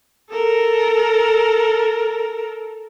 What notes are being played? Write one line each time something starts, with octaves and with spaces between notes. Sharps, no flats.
A4 A#4